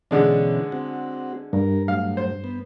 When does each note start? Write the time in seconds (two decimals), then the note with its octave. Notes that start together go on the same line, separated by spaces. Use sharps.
0.11 B2 D3 E3 G#3 C#4 D4
0.72 C4 F#4
1.53 G2 A#4
1.88 A2 F#3 F5
2.17 C5
2.44 B3